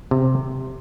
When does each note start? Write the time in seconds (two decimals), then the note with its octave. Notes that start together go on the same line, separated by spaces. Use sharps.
0.11 C3